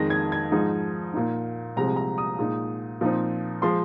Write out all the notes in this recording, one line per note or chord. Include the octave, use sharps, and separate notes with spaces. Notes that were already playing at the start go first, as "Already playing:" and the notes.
Already playing: F2 D#3 G#3 A#6
G#6
G#6
G#2 F3 G#3 D#4
A#2 A#3 D#4
C2 C3 F3 G#3 C4 A#5
A#5
D#6
A#2 G#3 D#4
A#2 F3 C4 D#4
F3 G#3 C6